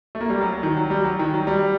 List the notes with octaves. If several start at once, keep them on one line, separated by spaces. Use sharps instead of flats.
A3
A#3
G3
F#3
F#3
D#3
F#3
G3
F#3
D#3
F#3
G3